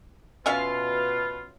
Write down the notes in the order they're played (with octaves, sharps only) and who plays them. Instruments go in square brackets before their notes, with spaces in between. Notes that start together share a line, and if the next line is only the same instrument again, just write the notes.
[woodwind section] B2 F4 [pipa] C#4 E5 F5 [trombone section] B4